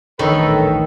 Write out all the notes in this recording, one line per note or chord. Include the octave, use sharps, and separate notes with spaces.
D#1 A1 D#3 D4 A4 B4 C#5 D#5